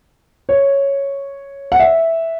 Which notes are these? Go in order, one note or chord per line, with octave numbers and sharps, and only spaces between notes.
C#5
F#5
E5